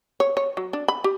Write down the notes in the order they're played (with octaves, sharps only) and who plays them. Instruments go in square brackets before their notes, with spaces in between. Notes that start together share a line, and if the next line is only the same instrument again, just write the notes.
[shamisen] C#5
C#5
F#3
D4
B5
G4